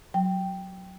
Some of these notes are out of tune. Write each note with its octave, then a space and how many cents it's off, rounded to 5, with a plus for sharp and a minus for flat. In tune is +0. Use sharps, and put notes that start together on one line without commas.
F#3 +0 G5 +0